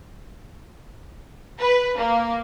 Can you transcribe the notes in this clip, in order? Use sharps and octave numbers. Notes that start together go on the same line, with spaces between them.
B4
A#3